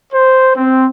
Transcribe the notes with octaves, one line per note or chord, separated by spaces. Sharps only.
C5
C4